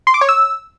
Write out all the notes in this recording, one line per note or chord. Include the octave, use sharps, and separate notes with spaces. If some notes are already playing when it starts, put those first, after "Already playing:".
C6
D6
C#5
E6